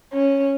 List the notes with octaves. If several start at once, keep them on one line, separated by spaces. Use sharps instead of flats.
C#4